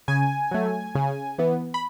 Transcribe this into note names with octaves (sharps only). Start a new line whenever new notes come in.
C#3 G#5
F#3 A3
C#3
E3 B3
B5